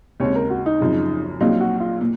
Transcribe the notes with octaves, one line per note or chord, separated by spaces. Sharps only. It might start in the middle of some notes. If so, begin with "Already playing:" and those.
D#2 C#3 G#3 C4 C#5
A#4
F#4
D#4
G#1 F#2 C#3 F3
A#1 A#2 F#3 C4 D#4 F4
F#4
F4
A#2